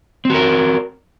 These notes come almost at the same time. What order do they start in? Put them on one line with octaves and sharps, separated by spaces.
C4 F#4 A#4